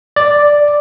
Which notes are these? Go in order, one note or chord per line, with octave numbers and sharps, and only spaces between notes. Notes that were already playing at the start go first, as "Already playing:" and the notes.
D5